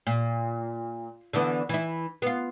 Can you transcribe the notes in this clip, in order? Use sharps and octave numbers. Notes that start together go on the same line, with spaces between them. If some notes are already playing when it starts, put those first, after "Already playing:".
A#2
D3 E3 B3
E3 E4
B3 F4